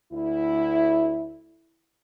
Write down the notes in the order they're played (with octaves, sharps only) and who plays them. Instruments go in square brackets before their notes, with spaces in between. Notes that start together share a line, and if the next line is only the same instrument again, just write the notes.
[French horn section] D2 E4